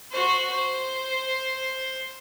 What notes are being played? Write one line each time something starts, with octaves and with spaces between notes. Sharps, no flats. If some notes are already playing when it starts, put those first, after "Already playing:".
F#4 C5
C5